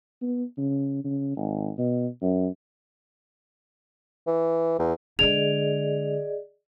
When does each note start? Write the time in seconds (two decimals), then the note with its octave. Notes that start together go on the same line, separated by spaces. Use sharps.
0.22 B3
0.58 C#3
1.04 C#3
1.37 G#1
1.78 B2
2.22 F#2
4.27 E3
4.79 E2
5.19 D3 G#3 G#4 D5 D#5 F7